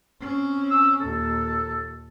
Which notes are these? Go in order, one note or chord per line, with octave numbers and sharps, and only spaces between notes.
C4 C#4
E6
D#2 A#2 A4